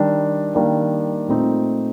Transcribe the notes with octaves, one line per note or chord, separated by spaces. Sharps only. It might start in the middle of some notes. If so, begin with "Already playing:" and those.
Already playing: D#3 G3 D4
D#3 G3 A#3 D4
A#2 A3 C4 D#4